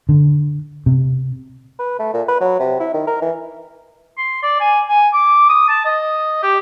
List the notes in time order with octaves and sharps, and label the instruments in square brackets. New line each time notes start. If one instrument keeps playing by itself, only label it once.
[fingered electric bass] D3
C3
[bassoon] B4
A3
A#2
B4
F#3
C3
E4
D#3
A#4
E3
[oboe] C6
D5
G#5
G#5
D6
D#6
A5
D#5
G4